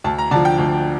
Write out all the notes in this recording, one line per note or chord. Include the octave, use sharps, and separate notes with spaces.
D2 A5
A#5
D3 F3 A5
G5
D2